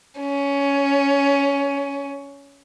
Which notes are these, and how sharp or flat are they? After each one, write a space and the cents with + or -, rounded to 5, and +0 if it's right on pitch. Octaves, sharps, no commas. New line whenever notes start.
C#4 +15